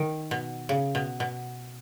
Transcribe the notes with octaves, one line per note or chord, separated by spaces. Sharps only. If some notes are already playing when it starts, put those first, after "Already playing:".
Already playing: D#3
B2
C#3
B2
B2